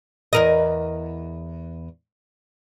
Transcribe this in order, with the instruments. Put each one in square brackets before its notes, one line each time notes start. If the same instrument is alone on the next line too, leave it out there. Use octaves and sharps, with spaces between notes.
[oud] E2 A#4 D#5